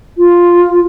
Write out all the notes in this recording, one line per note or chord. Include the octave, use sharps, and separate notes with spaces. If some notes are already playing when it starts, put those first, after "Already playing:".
F4